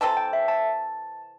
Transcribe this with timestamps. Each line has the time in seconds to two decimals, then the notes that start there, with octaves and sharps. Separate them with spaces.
0.01 C3 E3 C4 A4 A5
0.17 G5
0.33 E5
0.48 A5